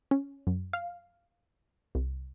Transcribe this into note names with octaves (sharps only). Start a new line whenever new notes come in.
C#4
F#2
F5
C2